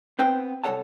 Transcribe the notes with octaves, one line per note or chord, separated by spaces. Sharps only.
B3 C4 B4 C5 G5
C2 G#3 A4 C#5 F#5 A5